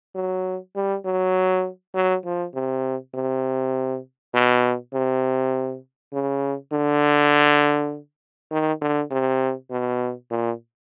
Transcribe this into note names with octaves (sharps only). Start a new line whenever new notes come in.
F#3
G3
F#3
F#3
F3
C3
C3
B2
C3
C#3
D3
D#3
D3
C3
B2
A#2